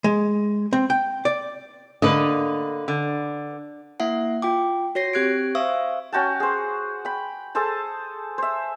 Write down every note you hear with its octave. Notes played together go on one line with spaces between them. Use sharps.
G#3
C4
G5
D5
D3 A#3 B4 D#5
D3
A#3 E4 E5 F#5
F4 G5 D6
F#4 C#5 A#6 C7
C4 G4 F#6 G#6 D7
C5 E5 F5 C#6 D#6 E6
C#4 F#4 G5 A5
G#4 C5
G5 B5
G#4 A4 C5 A5
C5 E5